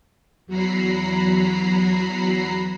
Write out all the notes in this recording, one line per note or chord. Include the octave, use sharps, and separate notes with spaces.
E2 F#3 F#4 A#5 B5 C7